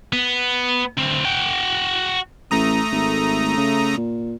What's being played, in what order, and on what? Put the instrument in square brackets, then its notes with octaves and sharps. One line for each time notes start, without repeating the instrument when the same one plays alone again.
[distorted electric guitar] B3
D2 C4
F#4 G5
[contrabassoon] A1 [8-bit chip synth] A3 A#5 D#6
[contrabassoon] G#1
C#3
A#2